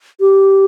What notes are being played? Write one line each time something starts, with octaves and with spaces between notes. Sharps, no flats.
G4